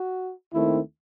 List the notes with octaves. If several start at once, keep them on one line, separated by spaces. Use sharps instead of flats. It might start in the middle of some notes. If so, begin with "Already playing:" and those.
Already playing: F#4
D#2 D#3 A3 C4 E4